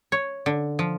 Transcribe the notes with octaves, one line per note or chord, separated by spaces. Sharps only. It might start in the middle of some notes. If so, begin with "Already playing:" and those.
C#5
D3
F3